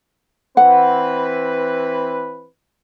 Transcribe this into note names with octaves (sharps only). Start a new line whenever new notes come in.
E3 C4 B4 F#5